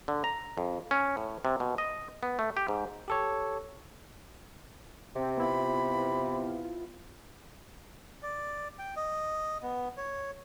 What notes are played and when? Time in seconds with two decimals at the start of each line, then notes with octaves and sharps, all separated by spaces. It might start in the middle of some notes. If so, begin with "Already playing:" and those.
0.08 D3
0.24 A#5
0.58 F2
0.91 C#4
1.17 A2
1.45 C3
1.60 B2
1.78 D#5
2.23 B3
2.39 A3
2.57 G4
2.68 G#2
3.08 G4 A4 C#5
5.16 C3 C4
5.38 B3 E4 F4 B5
8.23 D5
8.79 G5
8.96 D#5
9.63 B3
9.97 C#5